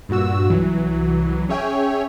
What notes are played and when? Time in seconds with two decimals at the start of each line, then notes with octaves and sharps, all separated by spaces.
0.09 G2 A#2 F#4 E6
0.50 C2 E3 F#3
1.49 C#4 G#4 C#5 E5 G5 G#5